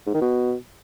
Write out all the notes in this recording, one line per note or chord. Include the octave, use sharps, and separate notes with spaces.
G#2
D#3
B2